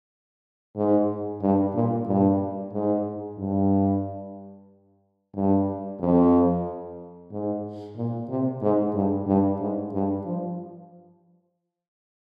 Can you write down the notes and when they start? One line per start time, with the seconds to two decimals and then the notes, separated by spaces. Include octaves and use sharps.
0.76 G#2
1.42 G2
1.74 A#2
2.07 G2
2.72 G#2
3.38 G2
5.34 G2
6.00 F2
7.31 G#2
7.96 A#2
8.29 C3
8.62 G#2
8.94 G2
9.27 G2
9.60 G#2
9.93 G2
10.25 F3